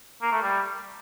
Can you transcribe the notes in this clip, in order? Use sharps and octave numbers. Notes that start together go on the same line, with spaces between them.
A#3
A3
G3